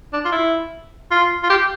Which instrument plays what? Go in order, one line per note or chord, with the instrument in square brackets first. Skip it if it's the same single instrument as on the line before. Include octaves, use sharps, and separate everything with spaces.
[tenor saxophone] D4
F4
E4
F4
F4
G4